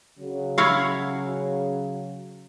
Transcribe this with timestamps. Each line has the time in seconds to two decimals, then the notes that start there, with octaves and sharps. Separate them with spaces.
0.19 C#3 F#3
0.58 E4 C#5 F5